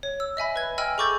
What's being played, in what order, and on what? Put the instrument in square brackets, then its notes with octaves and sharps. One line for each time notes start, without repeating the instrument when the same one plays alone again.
[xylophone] C#5
E6
D#5 E5 G#5 B5
B4 G#6
D#5 G5 G#5 B5 E6 F6
G#4 A4 C#6 D6 G6 A6